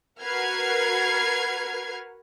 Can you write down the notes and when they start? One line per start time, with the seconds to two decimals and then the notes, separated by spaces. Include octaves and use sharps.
0.20 F#4 A#4 B4 F6 G#6 C7